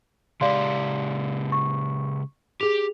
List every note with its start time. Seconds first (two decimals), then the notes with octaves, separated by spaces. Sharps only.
0.41 C#3 G#3 G4 D5 F5 C6
1.52 C#6
2.61 G4 G#4 F7